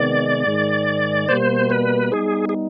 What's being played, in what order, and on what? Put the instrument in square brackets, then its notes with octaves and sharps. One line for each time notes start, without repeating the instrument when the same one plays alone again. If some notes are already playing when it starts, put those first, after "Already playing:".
Already playing: [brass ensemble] C3 D#3 G#3 B3 [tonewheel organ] D5
[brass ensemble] G#2 D#3 G#3
[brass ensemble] B2 G3 A#3 [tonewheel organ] C5
[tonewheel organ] B4
[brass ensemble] G3 B3 D#4 [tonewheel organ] G#4
[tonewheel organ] G#4